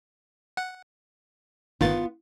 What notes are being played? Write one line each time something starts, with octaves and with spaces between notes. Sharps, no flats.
F#5
G1 D#3 B3 F4 A6